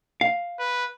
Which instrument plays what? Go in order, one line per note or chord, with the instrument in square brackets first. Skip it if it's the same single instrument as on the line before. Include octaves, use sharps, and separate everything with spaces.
[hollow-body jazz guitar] F5
[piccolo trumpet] B4